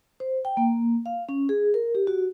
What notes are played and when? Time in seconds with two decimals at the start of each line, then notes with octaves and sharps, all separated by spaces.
0.20 C5
0.45 G5
0.57 A#3
1.06 F5
1.29 C#4
1.49 G#4
1.74 A#4
1.95 G4
2.07 F#4